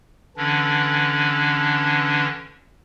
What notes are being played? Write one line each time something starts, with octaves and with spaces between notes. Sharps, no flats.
D3 E3 C#4 D4